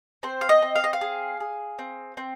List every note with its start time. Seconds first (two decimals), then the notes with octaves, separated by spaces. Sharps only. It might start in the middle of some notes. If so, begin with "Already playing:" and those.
0.23 C4 C5
0.41 F5
0.49 D#5
0.62 C4
0.76 F5
0.84 D#5
0.93 F5
1.01 G#4
1.40 G#4
1.79 C4
2.17 C4